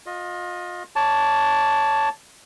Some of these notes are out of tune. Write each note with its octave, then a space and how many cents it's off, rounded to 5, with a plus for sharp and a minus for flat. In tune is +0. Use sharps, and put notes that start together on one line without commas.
F4 +30 D#5 +0
C#5 +0 A5 +0 D6 -25